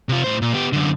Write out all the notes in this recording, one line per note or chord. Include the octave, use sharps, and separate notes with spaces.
C3 F4
A2 C5
A#2
B3 G4
F#2 D3